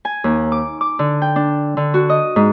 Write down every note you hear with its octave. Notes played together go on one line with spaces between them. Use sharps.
G#5
D#2
D6
D6
D3
G5
D4
D3
F#4
D#5
G#2